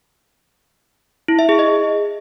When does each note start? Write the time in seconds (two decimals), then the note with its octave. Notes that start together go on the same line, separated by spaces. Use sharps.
1.28 E4
1.39 E5
1.49 G#4
1.59 D#5